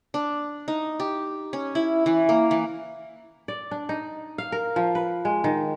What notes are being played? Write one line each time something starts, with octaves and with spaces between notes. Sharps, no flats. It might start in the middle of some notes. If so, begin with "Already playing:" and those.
D4
D#4
G4
C#4
E4
E3
A#3
E3
D5
D4
D#4
F5
A#4
F3
B4
G#3
D#3